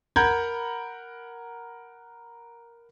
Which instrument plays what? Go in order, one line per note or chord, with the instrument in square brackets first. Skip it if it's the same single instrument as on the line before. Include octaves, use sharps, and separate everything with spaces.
[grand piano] A#4 F#5 A#5 B5 G6 G#6